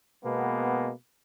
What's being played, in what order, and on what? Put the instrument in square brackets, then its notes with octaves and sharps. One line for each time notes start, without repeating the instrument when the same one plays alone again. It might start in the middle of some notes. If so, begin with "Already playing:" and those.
[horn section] B2 G#3 A#3 B3